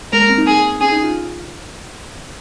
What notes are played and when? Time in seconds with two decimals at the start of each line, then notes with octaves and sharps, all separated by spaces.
0.13 G#3 A#4
0.21 A#3
0.29 C4
0.38 D#4
0.47 G#4
0.80 C#4 G#4
0.92 D#4
1.03 F4